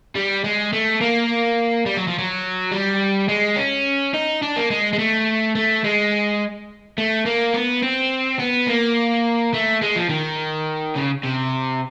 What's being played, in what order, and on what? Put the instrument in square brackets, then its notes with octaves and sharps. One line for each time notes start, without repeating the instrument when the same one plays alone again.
[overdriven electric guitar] G3
G#3
A3
A#3
G3
F#3
F3
F#3
G3
G#3
C#4
D#4
D4
A#3
G#3
G#3
A3
A3
G#3
A3
A#3
B3
C4
B3
A#3
A3
G#3
F3
D#3
C#3
C3